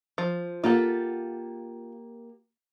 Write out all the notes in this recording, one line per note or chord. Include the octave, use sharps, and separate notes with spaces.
F3
A#3 F4 G4 A4 F#5